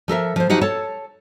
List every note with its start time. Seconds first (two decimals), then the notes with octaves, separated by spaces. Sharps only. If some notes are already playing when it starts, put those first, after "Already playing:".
0.08 F3 A4 A#4 E5
0.36 F3 C5
0.49 F3 F#3 D#4 G4 F#5
0.61 A4 C#5 A5